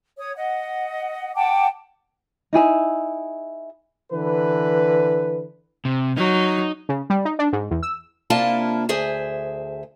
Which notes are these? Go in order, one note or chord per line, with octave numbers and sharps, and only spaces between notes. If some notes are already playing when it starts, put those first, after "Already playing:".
C#5 D#6
D#5 F#5
F#5 G5 A5 D6
D#4 E4 G#4 E5
D3 E3 B4
C3
F#3 D#4
C#3
G3
D#4
D4
G#2
E2
E6
C3 A#3 D4 E4 F4 A5
D2 G#4 C5 E5